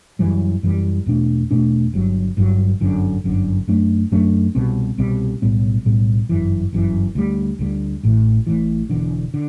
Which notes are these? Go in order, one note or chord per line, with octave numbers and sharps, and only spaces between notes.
F#2 E3 G3
F#2 E3 G3
E2 B2 A3 D4
E2 B2 A3 D4
G1 G2 F#3
G1 G2 F#3
G1 F#2 D3
G1 F#2 D3
F#2 F#3 A3 D4
F#2 F#3 A3 D4
C2 B2 G3 C4
C2 B2 G3 C4
B1 A2 G3 B3
B1 A2 G3 B3
G1 F#2 E3
G1 F#2 E3
D2 D3 G3
D2 D3 G3
A1 A2 E3
A1 A2 E3
E1 E2 D3
D3